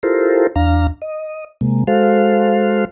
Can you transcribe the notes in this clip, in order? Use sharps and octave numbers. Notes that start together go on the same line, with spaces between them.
E4 F4 G4 A4 A#4 C5
E2 D4 F5 A#5
D#5
C3 G#3 A#3
G#3 F#4 A4 C5 F5